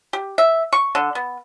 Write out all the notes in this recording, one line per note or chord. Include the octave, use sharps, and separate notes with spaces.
G4
E5
C#6
D3
B3